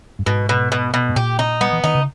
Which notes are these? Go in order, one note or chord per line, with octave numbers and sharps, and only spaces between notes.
G2
G#2 B2
B2
B2
B2
G#2
A#2 G4
D#4
G3 B3
E3
D#3 D#4
C#3